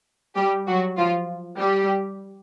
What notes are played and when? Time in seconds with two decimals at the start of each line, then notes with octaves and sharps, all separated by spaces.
0.36 G3 G4
0.67 F#3 F#4
0.98 F3 F4
1.58 G3 G4